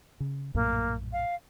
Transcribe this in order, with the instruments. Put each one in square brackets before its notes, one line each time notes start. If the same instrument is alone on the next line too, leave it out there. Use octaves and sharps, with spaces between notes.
[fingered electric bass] C#3
[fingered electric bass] A#1 F#2 A2 [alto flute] A#3
[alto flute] F5